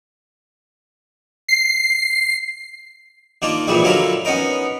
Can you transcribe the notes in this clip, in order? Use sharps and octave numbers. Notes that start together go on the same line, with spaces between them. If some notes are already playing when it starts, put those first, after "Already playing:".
C7
D#3 A#3 D4 F4
A#2 E3 F3 G3 G#3
D3 F#3 D4 E4 F4 A#4
B3 C#4 D#4 A#4